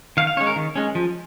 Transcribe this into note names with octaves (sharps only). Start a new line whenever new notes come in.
D#3 F5
F5
G#3 C#4 C#5
A#4
D#3
G#3 C#4
F3